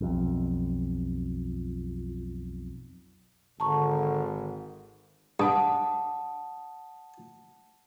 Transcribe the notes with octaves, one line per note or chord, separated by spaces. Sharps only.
B1 F2
G#1 D3 A5 A#5 C#6
G2 F#5 A5 D#6